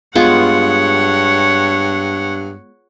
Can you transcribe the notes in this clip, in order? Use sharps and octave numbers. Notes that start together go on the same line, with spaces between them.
G2 G#3 B3 F4 C#5 F#5